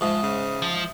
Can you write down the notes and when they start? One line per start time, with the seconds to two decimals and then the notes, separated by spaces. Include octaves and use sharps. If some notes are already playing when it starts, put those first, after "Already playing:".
0.01 G#2 F3 E5 D#6
0.23 C#3
0.62 F3